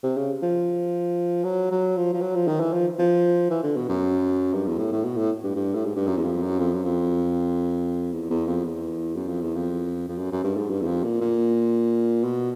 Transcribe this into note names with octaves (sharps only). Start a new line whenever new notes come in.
C3
C#3
F3
F#3
F#3
F3
F3
F#3
F3
D#3
E3
F3
F3
E3
D3
B2
F#2
G2
E2
A2
A2
B2
A2
G2
G2
A2
G#2
G2
F#2
E2
F2
F#2
F2
F#2
F2
E2
E2
F2
E2
F#2
F2
E2
F2
F2
F#2
F#2
G2
G#2
G2
E2
F2
A#2
A#2
B2